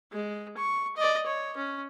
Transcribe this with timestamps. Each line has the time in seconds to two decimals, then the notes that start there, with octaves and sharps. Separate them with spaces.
0.12 G#3
0.57 C#6
0.96 D5 D#5
1.26 C#5
1.57 C#4